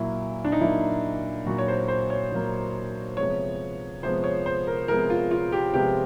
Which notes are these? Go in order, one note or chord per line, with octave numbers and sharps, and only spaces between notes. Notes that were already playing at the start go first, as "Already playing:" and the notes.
Already playing: A#2 F#3 A#3 E4
D4
D#4
A#2 F#3 A#3 E4
A#2 F#3 A#3 F#4
C#5
C5
C5
C#5
A#2 F#3 A#3
C3 F3 G#3 B3 C#5
C3 F3 G#3 B3 C5
C#5
C5
A#4
C3 F3 G#3 B3 A#4
F4
F4
G4
C3 F3 G#3 B3 G4